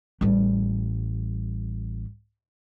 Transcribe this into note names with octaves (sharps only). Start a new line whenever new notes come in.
A1 G3